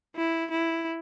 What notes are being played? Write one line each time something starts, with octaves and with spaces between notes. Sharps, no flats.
E4
E4